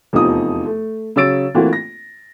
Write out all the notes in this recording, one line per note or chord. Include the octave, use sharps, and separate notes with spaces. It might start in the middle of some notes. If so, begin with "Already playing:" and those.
F1 E2 C3 F3 D#4 D#6
A3
C#3 F#3 C#5 E6 A6 D7
E3 A3 A#3 C4 F4 F#4
A#6